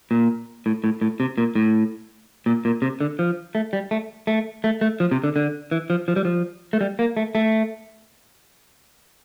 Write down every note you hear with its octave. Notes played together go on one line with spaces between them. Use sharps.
A#2
A2
A2
A2
C3
A#2
A2
A#2
A#2
C3
D3
F3
A3
G3
A3
A3
A3
A3
F3
C3
D3
D3
E3
F3
F3
G3
F3
A3
G3
A#3
A3
A3